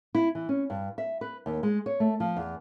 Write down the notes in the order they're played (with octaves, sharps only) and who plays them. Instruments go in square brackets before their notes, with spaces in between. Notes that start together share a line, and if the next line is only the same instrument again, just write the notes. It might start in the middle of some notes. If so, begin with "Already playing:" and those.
[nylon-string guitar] E4
E3
C#4
G2
E5
B4
D#2
G#3
C#5
A3
F3
E2